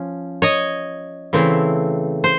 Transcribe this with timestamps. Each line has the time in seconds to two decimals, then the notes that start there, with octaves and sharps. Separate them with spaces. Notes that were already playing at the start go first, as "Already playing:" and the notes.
Already playing: F3 C#4
0.42 C#5 D#5
1.33 C#3 E3 A3 C4 E4
2.24 C5